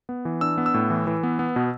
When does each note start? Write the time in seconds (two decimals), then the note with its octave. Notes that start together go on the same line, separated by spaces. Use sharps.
0.09 B3
0.25 E3
0.41 D4 E6
0.58 B3
0.66 E6
0.74 A2
0.90 E3
1.07 E3
1.23 B3
1.39 B3
1.56 B2